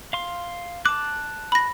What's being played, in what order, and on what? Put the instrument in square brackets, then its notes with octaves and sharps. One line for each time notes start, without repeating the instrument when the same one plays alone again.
[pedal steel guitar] F5 C6
[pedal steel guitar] A5 F#6 [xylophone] D6
[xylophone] B5 A#6